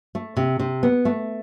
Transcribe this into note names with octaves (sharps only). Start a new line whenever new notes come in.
A3
C3
C3
B3
A3